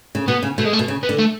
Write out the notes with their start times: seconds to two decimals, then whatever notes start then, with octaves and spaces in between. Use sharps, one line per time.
0.15 C#3
0.28 B2 B3
0.43 C#3
0.58 B2 A3
0.65 G#3
0.73 A3
0.79 B2
0.88 C#3
1.03 B3
1.09 D3
1.19 A3